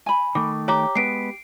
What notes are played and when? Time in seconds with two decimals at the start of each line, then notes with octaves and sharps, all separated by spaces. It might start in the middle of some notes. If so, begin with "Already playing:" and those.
0.06 G#5 B5
0.35 D#3 A3 D6
0.68 G4 C#5 A#5 D6
0.95 G#3 B3 B4 C7 D7